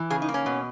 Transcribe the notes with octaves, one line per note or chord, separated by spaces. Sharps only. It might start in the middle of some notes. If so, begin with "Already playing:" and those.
Already playing: E3
C#3 G#4
D#4
A#3
C#4
B2